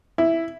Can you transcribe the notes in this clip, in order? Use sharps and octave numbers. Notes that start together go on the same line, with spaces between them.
E4